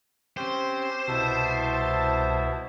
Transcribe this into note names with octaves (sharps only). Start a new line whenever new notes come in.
C4 C#4 G4 C5
C2 B2 E4 E5 A5